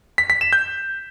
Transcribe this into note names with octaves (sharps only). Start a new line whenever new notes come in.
B6
B6
E7
G6